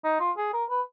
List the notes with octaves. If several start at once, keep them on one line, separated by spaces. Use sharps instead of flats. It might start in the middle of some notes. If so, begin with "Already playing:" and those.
D#4
F4
G#4
A#4
B4